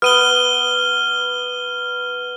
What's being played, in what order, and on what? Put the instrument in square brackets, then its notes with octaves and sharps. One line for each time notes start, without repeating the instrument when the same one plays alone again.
[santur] B3 [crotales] F6 D#7 G7